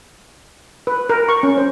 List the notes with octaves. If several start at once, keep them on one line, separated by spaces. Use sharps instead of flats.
B4
A#4
C#6
C#4
C5